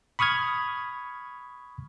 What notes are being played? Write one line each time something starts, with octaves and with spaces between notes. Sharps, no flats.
B5 C#6 D#6 F6 G#6